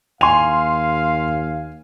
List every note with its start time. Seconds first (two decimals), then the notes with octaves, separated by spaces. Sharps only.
0.21 D#2 F5 G#5 C6 F7